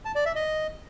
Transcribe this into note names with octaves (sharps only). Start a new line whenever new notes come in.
A5
D5
E5
D#5